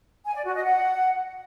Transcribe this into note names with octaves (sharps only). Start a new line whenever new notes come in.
G#5
D5
F#4
D#5
F#5